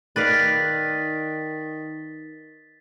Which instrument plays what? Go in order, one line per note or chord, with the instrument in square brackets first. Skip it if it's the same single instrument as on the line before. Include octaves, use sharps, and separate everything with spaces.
[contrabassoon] D#3 [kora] B4 D5 F5 [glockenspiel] A6 B6